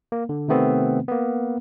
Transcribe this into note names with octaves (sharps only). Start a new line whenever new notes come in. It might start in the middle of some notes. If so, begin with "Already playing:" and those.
A#3
D3
C3 D#3 A3 B3 C4
A#3 B3